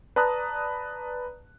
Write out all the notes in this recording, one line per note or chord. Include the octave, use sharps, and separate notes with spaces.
B4 D5 A5 A#5 D#6 F#6